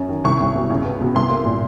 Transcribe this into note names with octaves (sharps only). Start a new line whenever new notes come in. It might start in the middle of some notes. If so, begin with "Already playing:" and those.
Already playing: F#2 C#4
D#3
C2 C#6
C2
B2
C#2
B3
B2
C2 C6
A#3
A#2